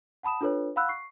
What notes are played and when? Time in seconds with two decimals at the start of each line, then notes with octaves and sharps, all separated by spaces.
0.23 F#5 A5 B5 D#6 E7
0.41 D4 F4 A4 B4 C#5
0.76 F5 F#5 B5 E6 F#6
0.88 C#6 C7